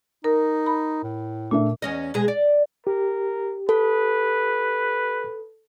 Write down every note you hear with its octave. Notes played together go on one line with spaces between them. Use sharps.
D#4 A#4
B5
A2
A#2 A3 D4 E5
E2 C#4 D#5
B2 G#3 G#4
D5
G4 A#4
A4 B4